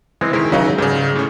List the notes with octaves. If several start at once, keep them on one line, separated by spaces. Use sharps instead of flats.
E3 G#3 C4
D#3 G#3 E4 A#4
C#2 C#3 F#3 D#4 E5
G#2 C#3 G3
A2 C#4